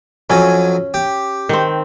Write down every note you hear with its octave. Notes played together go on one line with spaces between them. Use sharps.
F2 F#3 C#4 G#5
G4
D#3 C4